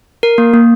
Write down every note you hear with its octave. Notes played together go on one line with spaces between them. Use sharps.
A#4
A#3
A#3